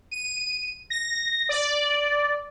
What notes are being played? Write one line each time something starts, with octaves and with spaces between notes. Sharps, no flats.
D#7
A#6
D5